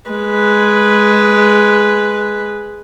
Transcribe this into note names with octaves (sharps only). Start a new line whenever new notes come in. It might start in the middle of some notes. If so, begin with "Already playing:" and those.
G#3 B4